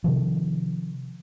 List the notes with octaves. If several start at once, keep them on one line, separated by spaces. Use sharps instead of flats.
C3 D#3 F3